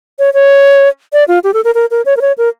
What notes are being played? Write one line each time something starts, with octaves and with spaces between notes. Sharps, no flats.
C#5
C#5
D5
F4
G4
A4
A#4
A#4
A#4
C#5
A#4
C#5
A#4